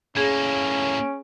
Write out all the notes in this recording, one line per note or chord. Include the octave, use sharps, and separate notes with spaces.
A2 A#3 C#4 G#4